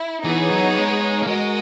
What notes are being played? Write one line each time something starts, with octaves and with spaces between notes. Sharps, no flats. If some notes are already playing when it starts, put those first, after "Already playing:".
Already playing: E4
E3 B3 D#4 G#4 C#5
F#3
G#3
A#3
G#3 F#4 A#4 D#5